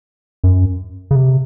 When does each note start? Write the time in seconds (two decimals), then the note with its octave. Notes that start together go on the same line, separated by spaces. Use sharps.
0.44 F#2
1.11 C#3
1.15 C3